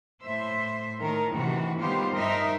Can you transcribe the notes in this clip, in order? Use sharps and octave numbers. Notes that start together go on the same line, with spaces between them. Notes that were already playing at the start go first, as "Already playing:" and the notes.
A2 C5 E5
A2 D#3 A#4
D2 C3 D#3 E3 F#4
D#3 G3 B3 F4 G4 C5
G2 D#4 A#4 C5 D#5 E5